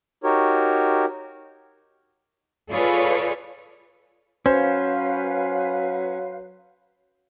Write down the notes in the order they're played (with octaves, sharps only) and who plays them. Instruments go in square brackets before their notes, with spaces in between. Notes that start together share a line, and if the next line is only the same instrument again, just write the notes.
[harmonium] D#4 F#4 G4 A#4 C#5
[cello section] F4 G#4 A4 B4 C#5 D5
[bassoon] F#3 [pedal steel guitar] C#4 [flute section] B4 F5 [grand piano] C5